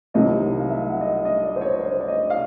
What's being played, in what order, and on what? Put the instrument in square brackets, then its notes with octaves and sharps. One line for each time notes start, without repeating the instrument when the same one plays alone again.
[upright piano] C2 C3 D#3 F#3 D#5
F5
E5
F#5
D#5
E5
D#5
D5
C5
C#5
C5
D5
D#5
F5